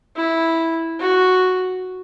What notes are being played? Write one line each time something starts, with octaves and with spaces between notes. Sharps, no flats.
E4
F#4